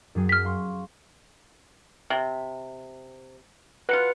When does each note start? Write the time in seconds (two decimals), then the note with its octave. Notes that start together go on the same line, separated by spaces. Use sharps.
0.15 F#2 F#3 G#4
0.29 F6 B6
0.45 F5 C6 C#6
2.10 C3
3.89 F#3 F4 B4 C#7